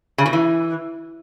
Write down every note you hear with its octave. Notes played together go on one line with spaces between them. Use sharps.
C#3
B2
E3